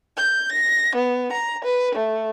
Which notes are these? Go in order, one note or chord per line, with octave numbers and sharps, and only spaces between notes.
G6
A#6
B3
A#5
B4
A3